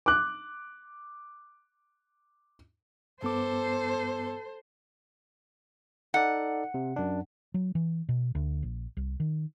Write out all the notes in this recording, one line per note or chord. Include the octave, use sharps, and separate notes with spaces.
D6 F#6
G2 B3 A4 C5 D6
D#4 A4 D5 F#5
C3
F#2 D4
F#3
E3
B2
D2
A#1
C2
D#3